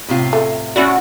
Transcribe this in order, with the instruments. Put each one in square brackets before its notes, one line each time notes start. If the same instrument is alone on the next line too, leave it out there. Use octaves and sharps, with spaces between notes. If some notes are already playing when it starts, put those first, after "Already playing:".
[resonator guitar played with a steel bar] A2 C3 F4
[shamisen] A3
[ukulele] C#4 E4 D5 [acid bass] F#4